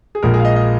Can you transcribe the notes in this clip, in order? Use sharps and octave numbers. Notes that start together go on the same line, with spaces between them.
G#4
A#1 A#2 G#3 A#4
G#4
F5
D#5
D#5